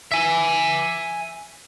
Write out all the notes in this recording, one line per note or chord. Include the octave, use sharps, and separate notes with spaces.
E5 G#5